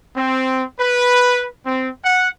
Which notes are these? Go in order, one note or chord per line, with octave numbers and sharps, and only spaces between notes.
C4
B4
C4
F#5